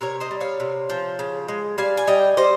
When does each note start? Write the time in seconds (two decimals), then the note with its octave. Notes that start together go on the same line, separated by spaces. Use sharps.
0.01 C3 A#4 C#5
0.20 C5 D#5
0.31 G3
0.41 C#5 F5
0.60 C3
0.90 F3
1.19 C#3
1.48 G#3
1.78 G3 F5 G#5
1.97 G#5
2.07 G3 D#5 G5
2.37 G3 C5 D#5